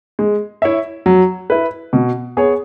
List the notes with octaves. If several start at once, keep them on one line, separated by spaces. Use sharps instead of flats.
G#3
E4 C#5 E5
F#3
E4 B4
B2
B3 G#4 C#5